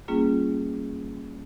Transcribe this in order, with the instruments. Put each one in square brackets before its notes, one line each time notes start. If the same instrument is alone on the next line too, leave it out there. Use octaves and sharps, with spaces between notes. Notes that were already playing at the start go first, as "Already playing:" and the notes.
[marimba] G3 A#3 C#4 F4 G#4